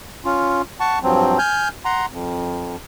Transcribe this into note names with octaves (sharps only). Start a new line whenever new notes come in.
C#4 F4
F#5 A5 C#6
G2 F3 F#3 C4
G#5 F6 G6
F#5 A#5 C6
F2